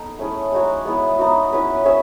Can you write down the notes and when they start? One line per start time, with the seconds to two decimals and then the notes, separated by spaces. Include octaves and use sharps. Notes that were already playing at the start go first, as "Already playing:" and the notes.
Already playing: B3 D#4 A4
0.19 A3 C#4 E4 G#4
0.52 G#3 D#4 F#4 C#5
0.85 G#3 B3 E4 G#4
1.19 B3 D#4 F#4
1.52 C#4 E4 G#4 B4
1.85 C#4 G#4 C#5 E5